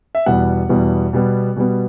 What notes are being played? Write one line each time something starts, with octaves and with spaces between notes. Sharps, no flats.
E5
E2 B2 G3 B3 F#5
E2 B2 G3 B3
B2 G3 B3
B2 G3 B3